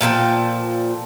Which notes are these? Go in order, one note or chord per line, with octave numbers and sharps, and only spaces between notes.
A#2 F3 A4 G5